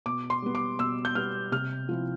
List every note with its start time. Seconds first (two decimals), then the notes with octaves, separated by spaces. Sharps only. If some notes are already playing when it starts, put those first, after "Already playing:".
0.06 B2 D6
0.30 C6
0.42 G3 B3
0.55 D6
0.79 B2 E6
1.05 G6
1.15 G3 B3 F6
1.52 C3 F6
1.89 F3 C4 E4